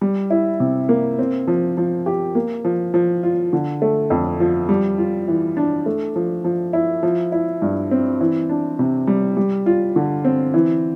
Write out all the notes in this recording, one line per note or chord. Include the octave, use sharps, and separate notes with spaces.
G3
E4
C3
A#3
C4
F3
F3
G4
A#3
F3
F3
F4
D3
A3
F2
F3
G3
F4
E3
D4
A3
F3
F3
E4
F3
E4
G2
C4
E3
D4
C3
G3
G3
F4
D3
C4
E3